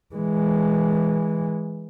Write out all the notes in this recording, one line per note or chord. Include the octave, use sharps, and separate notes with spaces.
E3 G#3